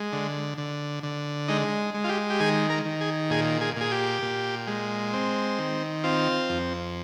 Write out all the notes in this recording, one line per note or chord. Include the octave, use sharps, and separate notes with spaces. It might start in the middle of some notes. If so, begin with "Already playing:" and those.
Already playing: G#3
D3
D3
D3
G#3 D#4
G#3
F4
G4
G4
D#3 G#4
A#4
D#3
G#4
A#2 G#4
G#4
A#2 G#4
G4
A#2
G#3
C4
D#3
C4 F4
F2